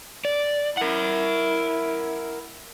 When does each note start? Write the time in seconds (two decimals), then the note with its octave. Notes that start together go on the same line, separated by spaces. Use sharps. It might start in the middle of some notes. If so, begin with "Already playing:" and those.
0.25 D5
0.77 E4 A#4 F#5